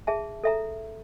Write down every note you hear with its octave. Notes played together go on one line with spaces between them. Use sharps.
G#4 E5 A5
A4 E5 A#5